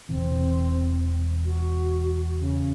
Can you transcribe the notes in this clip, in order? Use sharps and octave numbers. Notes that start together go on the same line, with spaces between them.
E1 C3 E3 C4
F#4
C#3